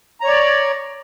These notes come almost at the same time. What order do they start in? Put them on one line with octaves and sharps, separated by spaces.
A#5 C#5 D5